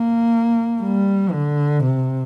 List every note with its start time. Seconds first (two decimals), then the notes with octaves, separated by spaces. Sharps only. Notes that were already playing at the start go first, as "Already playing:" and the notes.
Already playing: A#3
0.82 G3
1.32 D3
1.84 C3